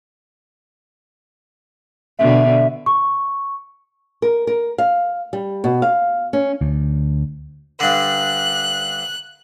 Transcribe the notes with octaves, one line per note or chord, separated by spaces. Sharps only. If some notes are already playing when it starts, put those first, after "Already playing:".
B2 D3 E5
C#6
A#4
A#4
F5
G3
B2
F5
C#4
D2
G2 D3 F#6